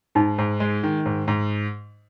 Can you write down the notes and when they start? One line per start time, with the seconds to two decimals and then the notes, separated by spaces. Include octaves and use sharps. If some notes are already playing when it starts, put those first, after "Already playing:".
0.15 G#2 D#4
0.38 G#2
0.60 G#3
0.83 D#3
1.06 G#2
1.28 G#2